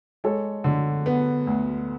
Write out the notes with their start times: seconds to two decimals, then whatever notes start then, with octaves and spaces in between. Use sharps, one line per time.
0.24 G#3 A4 C#5
0.64 D3
1.06 B3
1.47 D2